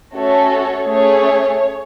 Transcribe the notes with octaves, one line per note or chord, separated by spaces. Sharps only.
A3 C#4 F#4 A4 C#5
A3 C#4 G#4 C#5